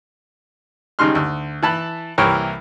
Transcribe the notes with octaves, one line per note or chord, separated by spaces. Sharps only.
G#1 C#3 G3 D#4 C6 F6
D2
E3 A5 B5
C2 E3 A#3 G4 A#4 C#5